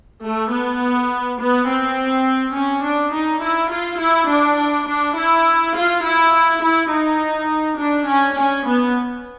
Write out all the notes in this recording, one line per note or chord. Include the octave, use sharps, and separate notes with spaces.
A3
B3
B3
C4
C#4
D4
D#4
E4
F4
E4
D4
D4
E4
F4
E4
E4
D#4
D4
C#4
C#4
B3